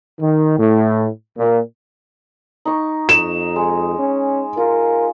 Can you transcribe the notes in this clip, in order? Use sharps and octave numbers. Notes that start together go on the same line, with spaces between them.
D#3
A2
A#2
D#4 C#6
F2 E7
G#3
C#4
F4 A#4